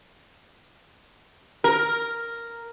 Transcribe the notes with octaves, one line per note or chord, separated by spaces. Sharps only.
A#4